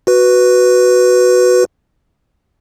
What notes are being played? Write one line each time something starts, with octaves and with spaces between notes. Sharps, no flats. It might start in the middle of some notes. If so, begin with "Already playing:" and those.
F#4 B4